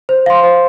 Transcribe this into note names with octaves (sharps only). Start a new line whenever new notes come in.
C5
F5 C6
C5